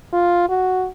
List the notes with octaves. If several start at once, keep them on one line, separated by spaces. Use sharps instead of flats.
F4
F#4